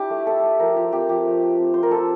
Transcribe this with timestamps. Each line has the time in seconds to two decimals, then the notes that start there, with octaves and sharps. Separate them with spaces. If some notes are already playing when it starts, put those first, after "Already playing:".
Already playing: D4 E4 G4
0.10 A3
0.27 E4 A4
0.43 A3
0.60 F3 A#4
0.76 F4 G4
0.92 C4 G4
1.09 F3 G4
1.26 A3
1.42 A3
1.58 C4
1.74 F4 C5
1.83 A#4
1.91 F4 A4